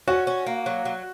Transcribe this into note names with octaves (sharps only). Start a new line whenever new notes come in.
C#4 F#4
C#4
A#3
F#3
F#3